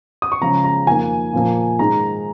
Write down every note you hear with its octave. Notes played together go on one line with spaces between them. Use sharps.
D#6
C#6
C#3 F3 G#3 A#5
A#5
F2 D#3 A#3 G#5
A#2 F3 A#3
G#2 D#3 G#3 A#5